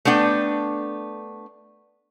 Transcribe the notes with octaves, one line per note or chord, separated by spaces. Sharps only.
A3 B3 D4 G5